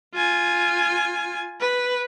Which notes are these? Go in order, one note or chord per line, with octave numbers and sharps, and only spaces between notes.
F4 G#5
B4